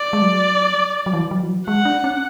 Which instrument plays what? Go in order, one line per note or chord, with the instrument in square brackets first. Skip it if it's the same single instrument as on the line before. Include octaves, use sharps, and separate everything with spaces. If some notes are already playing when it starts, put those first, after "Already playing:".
Already playing: [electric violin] D5
[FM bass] G#3
F#3
F#3
E3
F#3
E3
F#3
[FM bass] G#3 [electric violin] F#5
[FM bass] D4
C#4